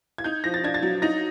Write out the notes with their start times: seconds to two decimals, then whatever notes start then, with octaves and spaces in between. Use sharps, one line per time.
0.18 G#6
0.24 D#4 G6
0.44 F3 A#6
0.54 A6
0.64 D4 G#6
0.74 A6
0.83 F#3
1.02 D#4 A#6